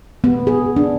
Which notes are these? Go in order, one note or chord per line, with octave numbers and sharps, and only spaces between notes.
B3
G#4
D4